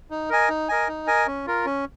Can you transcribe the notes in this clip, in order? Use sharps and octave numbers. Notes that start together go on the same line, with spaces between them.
D#4
A#4 D#5 G#5
D#4
A#4 D#5 G#5
D#4
A#4 D#5 G#5
C#4
F4 A#4
C#4